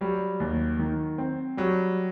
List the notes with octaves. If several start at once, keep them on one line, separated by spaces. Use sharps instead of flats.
F#3 G3
D#2
D#3
C4
F#3 G3